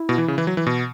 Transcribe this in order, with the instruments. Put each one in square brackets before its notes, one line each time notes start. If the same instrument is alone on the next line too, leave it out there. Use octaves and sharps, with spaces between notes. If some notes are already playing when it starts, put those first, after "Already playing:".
Already playing: [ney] E4
[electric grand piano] B2
E3
C#3
E3
F#3
E3
B2